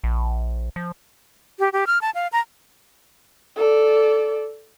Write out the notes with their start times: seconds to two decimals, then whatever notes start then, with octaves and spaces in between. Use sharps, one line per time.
0.04 A#1
0.76 F3
1.59 G4
1.73 G4
1.87 F6
2.01 A5
2.15 F5
2.33 A#5
3.56 A4 D5